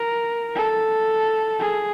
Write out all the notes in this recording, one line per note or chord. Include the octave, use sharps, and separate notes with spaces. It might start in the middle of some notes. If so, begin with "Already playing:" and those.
Already playing: A#4
A4
G#4